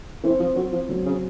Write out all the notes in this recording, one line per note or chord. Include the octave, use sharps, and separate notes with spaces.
E3 C4
F3
F#3 C4
F3
F#3
C#3